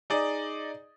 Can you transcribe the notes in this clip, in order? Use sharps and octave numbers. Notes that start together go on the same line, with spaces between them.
D#4 G#4 D5 D#5